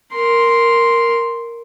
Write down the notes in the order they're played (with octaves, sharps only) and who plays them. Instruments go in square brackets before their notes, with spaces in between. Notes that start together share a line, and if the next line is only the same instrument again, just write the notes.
[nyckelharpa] A#4 C6